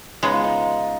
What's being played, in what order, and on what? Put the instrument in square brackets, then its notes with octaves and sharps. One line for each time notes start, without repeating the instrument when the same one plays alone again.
[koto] C#3 G#3 B3 [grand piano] D#4
[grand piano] F4
D#4